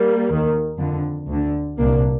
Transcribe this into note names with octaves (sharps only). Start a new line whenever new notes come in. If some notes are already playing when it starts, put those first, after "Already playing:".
Already playing: G3 A#3
D#2 D#3
F2 D3
D2 D3
C2 A#2 A#3 D4